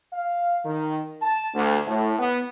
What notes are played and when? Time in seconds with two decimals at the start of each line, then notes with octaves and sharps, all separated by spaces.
0.14 F5
0.65 D#3
1.22 A5
1.55 D2
1.87 A2
2.19 B3